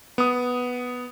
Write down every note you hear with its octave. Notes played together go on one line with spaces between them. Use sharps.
B3 D#6